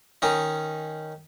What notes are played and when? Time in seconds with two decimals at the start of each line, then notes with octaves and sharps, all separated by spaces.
0.22 D#3 C#4 D#4